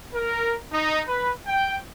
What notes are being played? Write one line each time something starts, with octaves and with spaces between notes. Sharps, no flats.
A#4
D#4
B4
G5